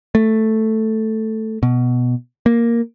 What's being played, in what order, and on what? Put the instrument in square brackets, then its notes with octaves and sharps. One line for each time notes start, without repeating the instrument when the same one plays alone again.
[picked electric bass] A3
B2
A#3